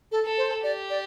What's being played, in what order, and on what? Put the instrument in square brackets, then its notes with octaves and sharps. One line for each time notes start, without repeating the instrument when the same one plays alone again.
[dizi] A4
[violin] A4
[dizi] C5
[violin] G4 [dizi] D5
[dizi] D5